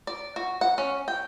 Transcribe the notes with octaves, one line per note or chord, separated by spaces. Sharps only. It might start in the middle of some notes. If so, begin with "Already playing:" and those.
D5
F#4
F#5
C#4
G5